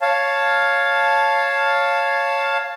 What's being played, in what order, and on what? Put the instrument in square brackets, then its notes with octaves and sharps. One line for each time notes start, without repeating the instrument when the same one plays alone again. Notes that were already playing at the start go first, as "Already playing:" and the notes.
[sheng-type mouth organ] C#5 F5 A5